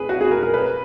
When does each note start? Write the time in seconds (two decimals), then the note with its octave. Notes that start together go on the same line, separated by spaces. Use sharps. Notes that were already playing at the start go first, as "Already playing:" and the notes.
Already playing: G#4 B4
0.09 F#4
0.21 G#4
0.31 A#4
0.43 A#4
0.54 B4